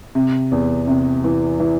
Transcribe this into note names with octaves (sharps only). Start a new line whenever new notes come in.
C3
E2
C3
E3
E3